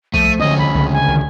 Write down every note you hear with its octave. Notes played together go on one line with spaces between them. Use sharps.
C2 F3 A3 D#7
D2 D3 C#4 D#5
B5
C#2 C#3
G#5
D#3